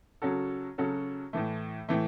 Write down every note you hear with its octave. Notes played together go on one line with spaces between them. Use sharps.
C#3 F#3 C#4 F#4 A4
C#3 F#3 C#4 F#4 A4
A2 E3 A3
A2 E3 A3